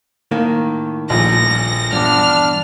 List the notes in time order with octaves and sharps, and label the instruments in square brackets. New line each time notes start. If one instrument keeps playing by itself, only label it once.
[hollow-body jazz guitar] A2 D#3 A#3
[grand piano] D#1 A#1 A#2 [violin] A#6
[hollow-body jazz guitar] E2 G2 [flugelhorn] D4 [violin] F6